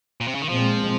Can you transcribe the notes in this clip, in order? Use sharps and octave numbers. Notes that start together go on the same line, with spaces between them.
A#2
C3
C#3
D#3
A#2 F3 G#3 C4